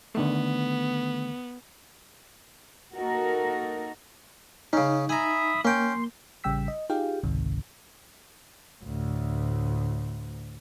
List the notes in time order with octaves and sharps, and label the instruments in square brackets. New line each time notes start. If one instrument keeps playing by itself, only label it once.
[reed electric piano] D3 D#3 A3 [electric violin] B3
[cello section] A#3 D#4 F#4 A4 A#4
[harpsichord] C#3 C#4 [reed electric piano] D#4
[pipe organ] E5 B5 D#6 [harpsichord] G#5 A#5
[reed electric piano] A#3 [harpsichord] C#4 G5 [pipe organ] C6
[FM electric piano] A1 C#3 G3 G5 E6 B6
D#5
D#4 F4 G4 G#4 F5 G5
G#1 C#2 G#2 C3 D#3
[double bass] D2 A2